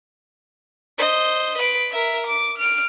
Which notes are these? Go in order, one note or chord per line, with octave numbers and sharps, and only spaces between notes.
C5 D#5
B4 D7
A#4 E5
D6
F6 D7